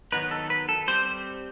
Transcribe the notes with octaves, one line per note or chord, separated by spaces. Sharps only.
D#3 F#3 B3 D#4 B4
A4
B4
A4
G3 C4 C5